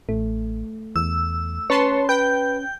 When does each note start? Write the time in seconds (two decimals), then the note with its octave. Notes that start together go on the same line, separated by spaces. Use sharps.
0.09 A1 A3
0.96 E2 E6
1.70 C#4 B4 C#5 A5 C6
2.09 B4 G5 G6